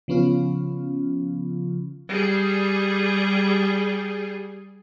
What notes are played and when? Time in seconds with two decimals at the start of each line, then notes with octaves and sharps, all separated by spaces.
0.08 C#3 F3 B3 C#4 F4
2.12 G3 G#4